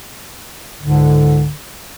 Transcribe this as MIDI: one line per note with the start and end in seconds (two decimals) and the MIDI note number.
0.81 1.51 37
0.81 1.51 44
0.81 1.51 50